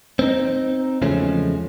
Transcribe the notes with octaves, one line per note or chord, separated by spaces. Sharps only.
C4 D#4
E2 C#3 F3 G#3 A3 C#4